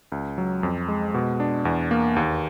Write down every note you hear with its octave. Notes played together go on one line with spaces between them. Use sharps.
C#2
F#3
F2
G#3
B2
D4
E2
A#3
D#2